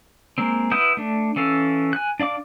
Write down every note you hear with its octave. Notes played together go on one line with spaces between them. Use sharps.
G#3 A#3 C4
E4 B4 F#5 D#6 G6
A3 D4
E3 C#4 A4 F5
G#5 F#6
D4 D5 F5 D6